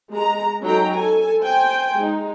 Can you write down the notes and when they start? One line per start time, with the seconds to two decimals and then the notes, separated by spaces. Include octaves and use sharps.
0.11 G#3 A#5
0.61 F#3 C#4 D#4 A4 G5 A#5
0.94 A4 G#5
1.42 C5 G5 G#5
1.96 G#3 D#4